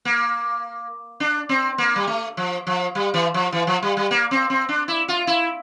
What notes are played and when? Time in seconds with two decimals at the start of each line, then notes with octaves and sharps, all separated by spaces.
0.05 A#3
1.20 D4
1.49 C4
1.78 A#3
1.96 G3
2.07 A3
2.37 F3
2.67 F3
2.95 G3
3.14 E3
3.34 F3
3.52 E3
3.67 F3
3.83 G3
3.97 G3
4.11 A#3
4.31 C4
4.50 C4
4.69 D4
4.88 E4
5.08 F4
5.27 E4